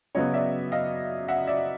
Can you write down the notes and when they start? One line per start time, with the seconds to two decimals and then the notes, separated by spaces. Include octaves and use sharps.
0.15 C#3 F#3 B3 C#5 D#5
0.34 D5 E5
0.72 D#5 F5
1.28 E5 F#5
1.47 D5 E5